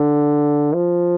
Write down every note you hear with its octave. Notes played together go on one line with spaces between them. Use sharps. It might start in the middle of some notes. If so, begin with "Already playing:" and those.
Already playing: D3
F3